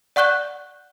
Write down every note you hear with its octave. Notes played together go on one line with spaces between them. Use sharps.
D5 F#5 C#6 F#6 G6 G7